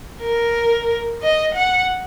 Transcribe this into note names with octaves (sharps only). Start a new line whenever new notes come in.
A#4
D#5
F#5